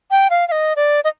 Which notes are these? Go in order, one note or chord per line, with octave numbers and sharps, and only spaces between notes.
G5
F5
F5
D#5
D5
D#5